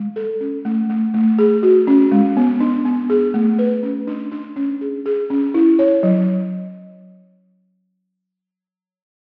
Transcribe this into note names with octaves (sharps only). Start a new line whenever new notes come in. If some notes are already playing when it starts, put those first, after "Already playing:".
Already playing: G#3
A4
C#4
A3
A3
A3
G#4
F#4
C#4
G#3
B3
D4
B3
G#4
A3
B4
C#4
D4
D4
C#4
G#4
G#4
C#4
E4
C#5
F#3